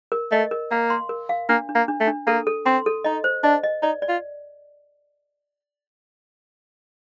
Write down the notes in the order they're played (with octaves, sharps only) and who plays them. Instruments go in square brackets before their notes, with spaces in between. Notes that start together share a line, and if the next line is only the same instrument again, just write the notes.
[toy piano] A#4
[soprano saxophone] A3 [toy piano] D#5
[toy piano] A#4
[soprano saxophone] A#3 [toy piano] F5
[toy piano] C6
A#4
F5
[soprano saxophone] A#3 [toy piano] D4
[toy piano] D4
[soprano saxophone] A#3
[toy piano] D4
[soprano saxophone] A3
[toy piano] D4
[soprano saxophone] A#3 [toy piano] A4
[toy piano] A4
[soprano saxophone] C4 [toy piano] C6
[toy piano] A4
[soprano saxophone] D#4 [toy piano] D#5
[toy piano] C5
[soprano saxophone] D4 [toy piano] D#5
[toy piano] D#5
[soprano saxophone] D#4 [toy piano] D5
[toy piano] D5
[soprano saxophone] F4